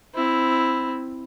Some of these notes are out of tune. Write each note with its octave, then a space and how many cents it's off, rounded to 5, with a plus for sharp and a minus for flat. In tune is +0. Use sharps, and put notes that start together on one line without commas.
C4 +0 E4 +0